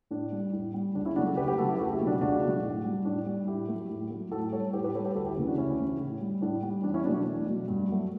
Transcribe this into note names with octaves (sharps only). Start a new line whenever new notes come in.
A2 D4
G3
A2
G3
C#2 D4
C#4 E4
C#3 F#3 A3 D4 F#4
F#4 A4
C#2 G4 B4
G4 B4
C#3 F#3 A3 F#4 A4
E4 G4
C#2 F#4 A4
E4 G4
B2 F#3 A3
D4 F#4
C#2 D4 F#4
B2 F#3 A3
A2
G3
A2 D4
G3
A2 E4 G4
F#3 A3
A2
F#3 A3
A2 F#4 A4
G3 A4 C#5
A2 G4 B4
G4 B4
G3 A4 C#5
G4 B4
D2 F#4 A4
E4 G4
C#3 E3 A3
D4 F#4
D2 C#4 E4
C#3 E3 A3
A2
G3
A2 D4
G3
E2 D4
C#4 E4
B2 F#3 A3 D4
D4
E2
B2 F#3 A3
G2
F#3 A3